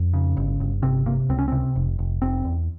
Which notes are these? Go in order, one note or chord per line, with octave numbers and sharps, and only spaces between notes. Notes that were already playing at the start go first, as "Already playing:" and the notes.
Already playing: F2
C#3
G1
G1
C3 C4
C3 A#3
C#2 C4
C#4
C3 C4
F1
F1
F1 C4
E2